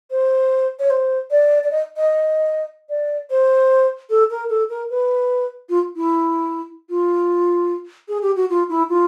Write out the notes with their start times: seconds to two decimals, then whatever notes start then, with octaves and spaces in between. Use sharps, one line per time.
0.11 C5
0.79 C#5
0.90 C5
1.31 D5
1.64 D5
1.71 D#5
1.97 D#5
2.89 D5
3.30 C5
4.10 A4
4.30 A#4
4.49 A4
4.70 A#4
4.90 B4
5.69 F4
5.96 E4
6.90 F4
8.09 G#4
8.22 G4
8.36 F#4
8.50 F4
8.69 E4
8.89 F4